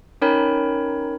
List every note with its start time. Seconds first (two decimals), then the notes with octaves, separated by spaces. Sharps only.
0.22 C#4 D#4 A#4 C#5 G5 B5